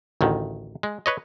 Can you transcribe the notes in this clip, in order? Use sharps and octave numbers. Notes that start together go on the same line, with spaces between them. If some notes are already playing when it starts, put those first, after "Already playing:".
A1 D2 D#3
G#3
B4 C#5 D#5